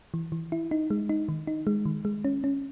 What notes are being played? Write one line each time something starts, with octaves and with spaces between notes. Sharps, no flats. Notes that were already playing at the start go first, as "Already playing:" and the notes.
E3
E3
E4
D#4
G#3
D#4
D#3
D#4
G#3
D#3
G#3
C#4
C#4